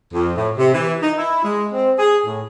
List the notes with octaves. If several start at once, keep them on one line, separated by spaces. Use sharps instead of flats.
F2
A2
C3
E3
D#4
E4
G#3
C4
G#4
A2